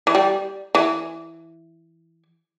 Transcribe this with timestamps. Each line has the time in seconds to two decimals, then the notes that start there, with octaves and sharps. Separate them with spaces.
0.07 E3
0.15 G3
0.75 E3